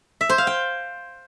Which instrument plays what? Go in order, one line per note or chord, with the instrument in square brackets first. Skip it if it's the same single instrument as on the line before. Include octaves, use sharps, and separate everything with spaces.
[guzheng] E5
C5
F5
G5